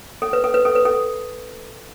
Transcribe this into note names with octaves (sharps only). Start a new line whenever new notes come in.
A4
B4
A4
B4
A4
B4
A4